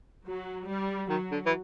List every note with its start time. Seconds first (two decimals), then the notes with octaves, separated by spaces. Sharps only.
0.27 F#3
0.68 G3
1.10 D#3 F#3
1.32 D3
1.46 E3